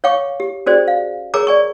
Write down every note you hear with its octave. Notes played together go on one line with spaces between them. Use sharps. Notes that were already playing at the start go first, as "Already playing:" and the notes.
C#5 F5 G5 C#6 D6
G4
C#4 F#4 G#4 C5 D5
F5
G#4 A#4 C#5 G#5 A#5 D6
D5 G#5 C#6